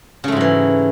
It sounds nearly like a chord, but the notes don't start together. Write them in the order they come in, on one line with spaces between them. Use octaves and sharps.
C#3 A3 G#2 F#3 E3